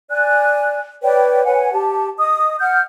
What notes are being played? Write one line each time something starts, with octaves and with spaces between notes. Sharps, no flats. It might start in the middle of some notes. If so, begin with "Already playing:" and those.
D5 G#5 F#6
B4 C#5 D5 G5
B4 C#5 F#5 G#5
G4 A5
D#5 D#6
F#5 F6 G6